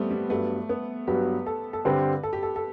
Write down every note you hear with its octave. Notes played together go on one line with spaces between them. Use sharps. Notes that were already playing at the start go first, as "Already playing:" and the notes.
Already playing: G3 A3 B3 C4
G3
G2 F#3 A3 B3
B3
G2 F#3 B3 G4
A4
A4
G2 D3 G3 C4 G4 B4
A4
G4
A4
A4